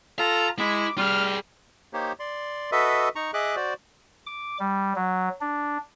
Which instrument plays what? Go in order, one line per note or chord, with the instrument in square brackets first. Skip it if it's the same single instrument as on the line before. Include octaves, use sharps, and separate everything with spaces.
[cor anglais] F4 [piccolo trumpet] A4 [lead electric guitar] A#5
[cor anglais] G#3 [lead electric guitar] E4 [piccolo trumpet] D6
[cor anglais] G3 [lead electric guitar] F4 G#4 [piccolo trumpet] F6
[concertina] A#3 D#4 G4 C5 C#5
D5 C6
F#4 A4 B4 D#5 E5
D#4 A#5 C#6
G#4 D#5 E5 D6 F#6
F#4 C5 D5
[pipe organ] D6
G3
F#3
D4